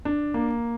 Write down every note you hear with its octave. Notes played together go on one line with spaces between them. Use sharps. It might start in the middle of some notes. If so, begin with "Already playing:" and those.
D4
A#3